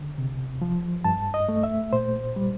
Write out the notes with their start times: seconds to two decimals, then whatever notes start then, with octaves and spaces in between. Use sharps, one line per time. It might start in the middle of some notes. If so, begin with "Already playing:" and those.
Already playing: D3
0.18 C3
0.62 F3
1.04 G2 A5
1.34 D#5
1.49 A3
1.63 E5
1.93 A#2 C5
2.36 G3